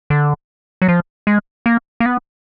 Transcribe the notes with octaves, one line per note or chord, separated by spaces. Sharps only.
D3
F#3
F3
G#3
A#3
A#3
B3